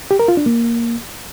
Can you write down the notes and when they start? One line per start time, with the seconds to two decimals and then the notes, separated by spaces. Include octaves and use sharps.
0.11 G4
0.19 A#4
0.28 F4
0.37 D4
0.46 A#3